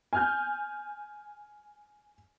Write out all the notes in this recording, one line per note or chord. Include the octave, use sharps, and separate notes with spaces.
G#5 F6 G6